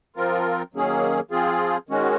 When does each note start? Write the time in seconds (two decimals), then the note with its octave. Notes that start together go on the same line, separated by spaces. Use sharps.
0.16 F3 C4 F4 A#4
0.74 D#3 F#3 A#3 C#4 G#4
1.31 F3 C4 F4 G#4
1.89 D#3 G#3 C#4 F#4